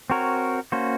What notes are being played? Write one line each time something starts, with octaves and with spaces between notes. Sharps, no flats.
C4 F#4 A#4 C#5
A#3 C#4 F#4 C5